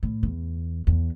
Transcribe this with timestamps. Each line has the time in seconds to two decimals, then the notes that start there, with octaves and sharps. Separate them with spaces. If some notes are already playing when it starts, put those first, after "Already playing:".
0.03 A2
0.23 E2
0.87 E2